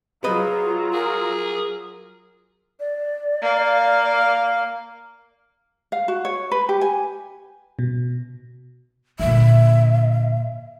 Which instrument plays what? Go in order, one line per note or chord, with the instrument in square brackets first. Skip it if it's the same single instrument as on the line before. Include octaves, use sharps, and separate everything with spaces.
[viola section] F#3 F4 A#5 [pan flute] G#4 [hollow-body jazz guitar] B4 D#5
[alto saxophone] G#4 [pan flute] A#4
[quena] D5
[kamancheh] A#3 F5
[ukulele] F5
F#4
C#5
B4
G4
G#5
[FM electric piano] B2
[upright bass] A#2 D3 [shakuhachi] E5